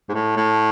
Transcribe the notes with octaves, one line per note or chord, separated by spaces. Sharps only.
G#2
A2
A2